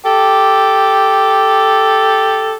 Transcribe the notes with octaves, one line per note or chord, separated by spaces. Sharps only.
G4 A4